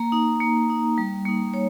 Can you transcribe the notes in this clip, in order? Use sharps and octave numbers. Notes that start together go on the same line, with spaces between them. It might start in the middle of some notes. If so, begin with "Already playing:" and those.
Already playing: A#3 A#5
D#4
A#3
D#4
G3
A#3 D#4
C#5